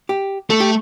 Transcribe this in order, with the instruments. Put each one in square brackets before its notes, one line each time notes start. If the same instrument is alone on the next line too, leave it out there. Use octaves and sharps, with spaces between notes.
[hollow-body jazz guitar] G4
[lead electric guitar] A3 [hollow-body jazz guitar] A4
[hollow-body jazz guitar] G4